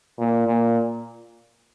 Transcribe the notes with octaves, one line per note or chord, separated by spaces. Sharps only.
A#2
A#2